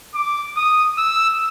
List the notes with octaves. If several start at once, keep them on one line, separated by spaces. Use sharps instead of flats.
D6
D#6
E6